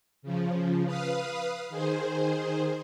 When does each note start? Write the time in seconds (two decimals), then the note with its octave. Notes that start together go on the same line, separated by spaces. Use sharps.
0.22 C#3 F3
0.85 B4 F5 D#6
1.69 D#3 G#4 C5